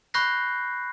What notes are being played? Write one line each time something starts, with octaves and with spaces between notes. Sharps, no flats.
B5 C#6 F#6 G6 A#6 C7